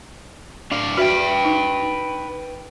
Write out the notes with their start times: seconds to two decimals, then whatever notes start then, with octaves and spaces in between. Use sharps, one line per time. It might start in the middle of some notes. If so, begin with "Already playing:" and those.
0.71 D4 F5
0.97 F#4 B4 E5 G5
1.45 D#4